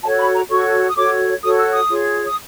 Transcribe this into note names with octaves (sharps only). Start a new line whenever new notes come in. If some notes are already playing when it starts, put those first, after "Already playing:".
F#4 A4 C#5 A5
B5
A#5
F#4 A4 C#5 C#6
D#6
F#4 A4 C#5 D6
F#4 A4 C#5 D#6
E6
D#6
F4 G#4 C#5
D#6